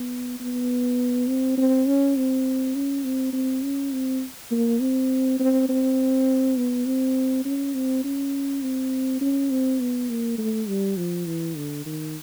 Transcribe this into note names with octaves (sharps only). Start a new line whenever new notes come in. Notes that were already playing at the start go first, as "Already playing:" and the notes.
Already playing: B3
B3
C4
C4
C#4
C4
C#4
C4
C4
C#4
C4
A#3
C4
C4
C4
B3
C4
C#4
C4
C#4
C4
C#4
C4
B3
A#3
A3
G3
F3
E3
D3
D#3